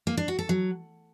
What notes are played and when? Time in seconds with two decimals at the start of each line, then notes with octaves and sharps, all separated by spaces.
0.07 A#3
0.17 D4
0.28 F#4
0.39 A4
0.49 F#3